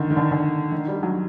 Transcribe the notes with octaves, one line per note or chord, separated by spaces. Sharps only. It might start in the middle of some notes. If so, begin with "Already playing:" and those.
Already playing: D3 D#3
D#3
D3
D3
D#3
G3
F#3